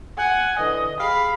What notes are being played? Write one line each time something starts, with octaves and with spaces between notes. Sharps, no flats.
F#5 G#5
D3 E3 D#5
G4 G#4 F5 B5